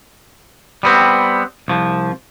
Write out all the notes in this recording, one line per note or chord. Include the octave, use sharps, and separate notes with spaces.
G3 B3 C4
C2 F3